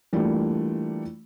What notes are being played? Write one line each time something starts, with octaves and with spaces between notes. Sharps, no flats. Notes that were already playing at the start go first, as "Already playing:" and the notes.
E3 G3 A3 A#3 D4 F4